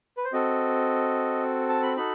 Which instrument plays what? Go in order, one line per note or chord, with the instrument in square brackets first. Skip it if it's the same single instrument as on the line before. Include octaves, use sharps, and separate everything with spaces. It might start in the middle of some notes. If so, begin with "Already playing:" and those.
[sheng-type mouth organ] B4
C5
C4 F#4 A4 D#5
A5
B5
D#4 F#4 A4 B5